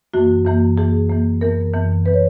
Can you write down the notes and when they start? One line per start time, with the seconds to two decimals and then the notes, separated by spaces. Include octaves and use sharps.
0.14 F#2 E3 A#3 F#4
0.45 F#2 E3 A#3
0.78 F#2 E3 A#3 G#4
1.09 F#2 E3 A#3
1.41 F#2 E3 B3 A#4
1.74 F#2 E3 B3
2.05 E3 B3 B4
2.14 C#5